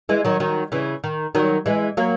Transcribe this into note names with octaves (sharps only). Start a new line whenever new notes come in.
E3 G#3
D#3 F#3
D#3 F#3
C#3 E3
D#3
D#3 F#3
E3 G#3
F#3 A#3